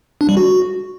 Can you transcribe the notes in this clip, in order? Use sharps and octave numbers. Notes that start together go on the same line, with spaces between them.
D4
G3
F#4